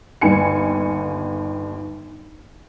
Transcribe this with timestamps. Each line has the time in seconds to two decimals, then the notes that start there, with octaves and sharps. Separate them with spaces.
0.21 G1 D#2 G#5 C#7